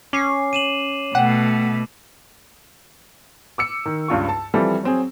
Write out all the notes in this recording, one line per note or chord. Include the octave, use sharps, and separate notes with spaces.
C#4 D6 C7
D#7 E7 F#7
B2 A3 F#5 G5 F#6
D6 E6 C#7
D#3
C#2 G2 F4 C#6
A5
E3 F3 G3 C4 A4
F#3 C4 G#4